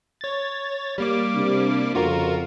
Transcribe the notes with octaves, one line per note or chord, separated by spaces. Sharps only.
C#5 A6
G3 A#3 D6
C3 D4
F2 C#3 F4 F#4 A#4